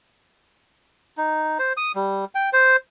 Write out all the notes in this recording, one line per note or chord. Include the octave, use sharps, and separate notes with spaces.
D#4
C5
D#6
G3
G5
C5